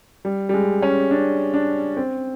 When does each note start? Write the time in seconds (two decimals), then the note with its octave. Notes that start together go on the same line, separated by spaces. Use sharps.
0.25 G3
0.49 G3
0.54 G#3
0.82 C#4
1.11 D4
1.54 D4
1.97 C4